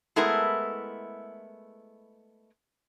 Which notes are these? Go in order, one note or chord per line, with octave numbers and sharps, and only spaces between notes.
G#3 A3 B3 E4 G#4 A#4